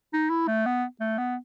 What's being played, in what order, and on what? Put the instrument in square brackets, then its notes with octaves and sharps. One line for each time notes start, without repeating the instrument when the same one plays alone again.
[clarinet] D#4
E4
A3
B3
A3
B3